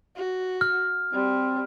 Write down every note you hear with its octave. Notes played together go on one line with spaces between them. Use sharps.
F#4
F6
G3 C4